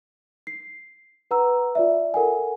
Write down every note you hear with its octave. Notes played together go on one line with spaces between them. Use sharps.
C7
B4 F#5 A#5 E6
F4 D5 E5
A4 A#4 F#5 G#5